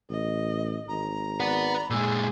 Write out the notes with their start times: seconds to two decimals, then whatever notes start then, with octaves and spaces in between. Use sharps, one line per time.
0.10 A1 D#5
0.88 G#1 A#5
1.40 B4 D5 F#5 B5
1.90 A#2 G#3 G#4 E6